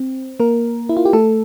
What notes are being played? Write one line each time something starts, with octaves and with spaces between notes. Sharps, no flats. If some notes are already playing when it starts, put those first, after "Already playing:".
Already playing: C4
A#3 A#4
E4
F4
G4
A3 A4